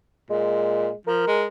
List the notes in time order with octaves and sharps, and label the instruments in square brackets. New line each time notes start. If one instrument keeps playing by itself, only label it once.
[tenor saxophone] A#2 [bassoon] G#3
[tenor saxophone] F3 [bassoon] A#4
[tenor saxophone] G#3